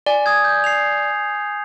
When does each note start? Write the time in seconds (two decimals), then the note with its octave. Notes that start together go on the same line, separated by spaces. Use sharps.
0.06 D5 G#5
0.26 D#6 G#6
0.44 G6
0.64 C7 F7